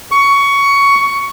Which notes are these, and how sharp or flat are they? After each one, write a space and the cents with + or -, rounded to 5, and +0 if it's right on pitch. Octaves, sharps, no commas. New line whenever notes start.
C#6 +15